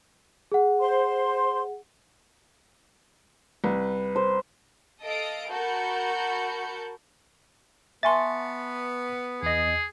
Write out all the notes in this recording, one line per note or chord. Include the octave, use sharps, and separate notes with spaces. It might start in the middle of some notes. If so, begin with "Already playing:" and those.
G#4 F#5
C5 C6
C2 B4
C5
A4 D#5 F5 D#6 D7
F#4 A#4 A5 B5 G6 C#7
B3 E5 G#5 A5 C6 C#6 A6
E2 G#4 D#5